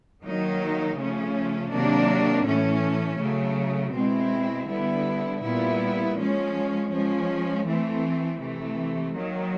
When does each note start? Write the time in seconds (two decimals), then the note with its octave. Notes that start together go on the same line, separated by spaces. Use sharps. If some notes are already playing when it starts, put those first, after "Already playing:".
0.22 D#3 F#3 A#3 D#4
0.96 C#3 F3 A3 C#4
1.71 C3 D#3 F#3 A#3 D4
2.45 A2 E3 A3 C#4
3.20 C#3 F#3 A3
3.94 B2 G#3 C4 E4
4.68 D3 G3 B3 E4
5.42 A#2 G3 B3 E4
6.16 F3 G#3 C#4
6.91 F3 G#3 C#4
7.65 E3 A3 C4
8.40 C3 E3 A3
9.14 D#3 F#3 A#3